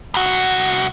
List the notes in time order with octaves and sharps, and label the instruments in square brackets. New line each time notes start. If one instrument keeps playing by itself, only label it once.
[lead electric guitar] C2 F#4